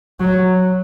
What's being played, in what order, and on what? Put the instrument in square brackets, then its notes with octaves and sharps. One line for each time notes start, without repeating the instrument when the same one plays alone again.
[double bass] F#3